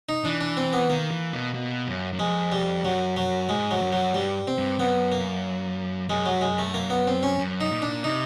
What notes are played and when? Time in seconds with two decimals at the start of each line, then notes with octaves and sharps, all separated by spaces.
0.09 D#4
0.25 E3 D4
0.41 D4
0.57 C4
0.73 B3
0.90 D#3 A#3
1.11 E3
1.33 B2
1.54 B2
1.87 F#2
2.13 F#2
2.19 F2 G#3
2.52 G3
2.85 F#2 F#3
3.17 F#3
3.49 G#2 G#3
3.71 F#3
3.81 F#2
3.93 F#3
4.14 G2 G3
4.47 C4
4.58 G2
4.79 F#2 B3
5.12 A#3
6.09 F#2 G#3
6.26 F#3
6.41 G#3
6.58 A3
6.74 A#3
6.90 B3
7.07 C4
7.23 C#4
7.39 F#2
7.61 D#4
7.71 A#2
7.82 D4
8.04 C3 D#4